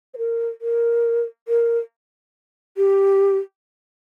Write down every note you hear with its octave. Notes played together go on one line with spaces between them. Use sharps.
C5
A#4
A#4
A#4
G4